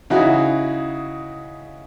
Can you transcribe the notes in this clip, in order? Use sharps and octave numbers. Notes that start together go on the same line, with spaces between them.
C#3 D#4 E4 F#4